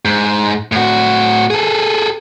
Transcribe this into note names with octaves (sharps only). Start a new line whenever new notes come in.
G#2
A2 F#4
G#4 A4